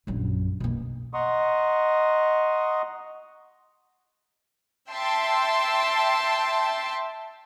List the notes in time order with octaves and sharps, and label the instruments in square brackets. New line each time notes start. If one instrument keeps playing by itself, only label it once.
[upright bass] A#1 F#2
B2 A#3
[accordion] D#5 F#5 A#5 C6 C#6 D#6
[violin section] E5 G5 A5 C6 E6